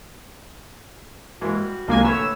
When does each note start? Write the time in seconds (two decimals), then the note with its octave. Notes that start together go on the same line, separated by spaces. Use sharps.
1.41 G#2 E3 A#3 F#4
1.53 G3
1.88 C2 F3 G#3 A#3 D4 F4 G#5
2.04 A2 D3 A3 B4 C#5 E6